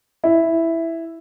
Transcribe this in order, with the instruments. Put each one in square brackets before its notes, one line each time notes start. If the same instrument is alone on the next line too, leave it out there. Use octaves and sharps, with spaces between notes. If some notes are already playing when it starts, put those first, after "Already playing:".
[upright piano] E4